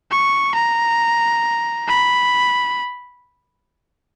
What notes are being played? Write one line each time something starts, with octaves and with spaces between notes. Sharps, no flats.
C#6
A#5
B5